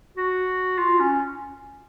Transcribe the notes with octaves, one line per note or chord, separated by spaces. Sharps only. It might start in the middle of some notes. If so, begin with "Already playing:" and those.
F#4
F4
C#4